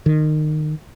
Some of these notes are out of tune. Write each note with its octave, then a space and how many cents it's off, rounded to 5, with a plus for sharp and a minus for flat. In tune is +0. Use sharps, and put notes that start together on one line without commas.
D#3 -25